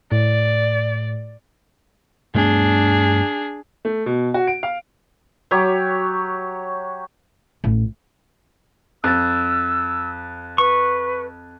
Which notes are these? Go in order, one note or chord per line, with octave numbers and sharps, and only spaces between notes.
A2 D5
G2 A3 B3 D4 G#4
A3
B2
F#4
D7
F5
F#3 G4 C#5
A1
F2 E6 F#6 A6
B4 C#6